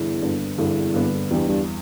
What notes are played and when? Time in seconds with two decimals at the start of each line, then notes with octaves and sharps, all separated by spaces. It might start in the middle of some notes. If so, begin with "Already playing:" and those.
Already playing: E2 G2 D3 B3 D4
0.21 G2 D3 B3 D4
0.58 E2 G2 D3 B3 D4
0.94 G2 D3 B3 D4
1.31 E2 G2 E3 G3
1.49 G2